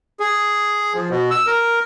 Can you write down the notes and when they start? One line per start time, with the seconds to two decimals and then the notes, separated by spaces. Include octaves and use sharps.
0.20 G#4
0.94 F3
1.10 B2
1.31 E6
1.47 A#4